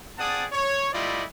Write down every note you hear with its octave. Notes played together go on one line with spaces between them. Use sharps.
C4 G#4 D5 F#5 A5 D#6
C#5
G3 A3 E4 F4 D5 D#5